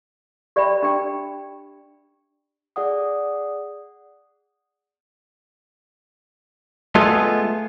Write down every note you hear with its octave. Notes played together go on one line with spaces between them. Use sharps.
G4 D5 E5 G5 B5
D4 G4 G5
G#4 D5 F#5 D#6
G#3 A3 B3 F4 G#4